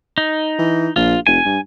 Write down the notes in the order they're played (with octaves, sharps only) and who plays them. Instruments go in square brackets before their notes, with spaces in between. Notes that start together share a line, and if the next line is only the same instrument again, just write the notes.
[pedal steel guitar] D#4
[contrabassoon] E3
[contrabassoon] A#1 [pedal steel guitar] F4
[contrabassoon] F1 [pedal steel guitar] G#5
[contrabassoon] G2